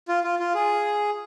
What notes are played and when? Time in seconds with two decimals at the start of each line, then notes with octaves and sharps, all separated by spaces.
0.08 F4
0.24 F4
0.39 F4
0.55 G#4